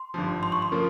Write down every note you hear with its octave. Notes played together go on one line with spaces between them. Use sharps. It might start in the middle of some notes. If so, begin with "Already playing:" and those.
Already playing: C6
G#1 G2 F3
C6
C#6
C6
C#3 F3 A#3 F4